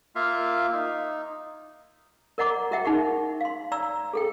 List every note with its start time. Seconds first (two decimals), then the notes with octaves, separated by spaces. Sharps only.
0.15 A#3 F4 E5 F5
0.72 D#4
2.38 A#4 D5 D#5 F#5 A#5 D6
2.71 F#4 A#4 D#5 E5 F#5 G5
2.85 D#4 G#4 F#5 C#6
3.41 F5 C6
3.72 D5 A#5 E6
4.13 G#4 A4 G5